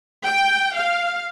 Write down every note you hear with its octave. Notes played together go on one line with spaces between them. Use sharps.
G5
F5